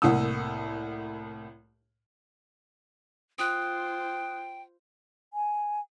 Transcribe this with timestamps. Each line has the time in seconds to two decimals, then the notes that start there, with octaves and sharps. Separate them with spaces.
0.02 C2 A2 A#3 F#5 D#6 E6
3.39 F4 C5 G5 D#6 F#6
5.33 G#5